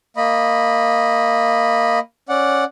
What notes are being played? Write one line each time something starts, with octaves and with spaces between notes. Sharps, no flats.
A#3 D#5 B5
C#4 D5 F#5